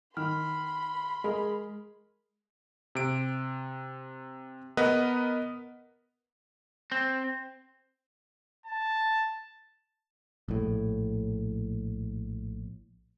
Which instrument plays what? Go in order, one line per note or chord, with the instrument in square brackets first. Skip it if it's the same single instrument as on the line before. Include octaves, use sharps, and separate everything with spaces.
[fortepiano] D#3 [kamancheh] B5 C6 [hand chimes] F6
[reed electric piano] G#3 [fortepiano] G#4 A#4
[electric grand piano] C3 D7
B3 A#4 B4 D#5 F#5
[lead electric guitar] C4
[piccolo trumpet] A5
[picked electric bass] A#1 A2